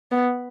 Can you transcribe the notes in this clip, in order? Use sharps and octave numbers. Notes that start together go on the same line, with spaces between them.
B3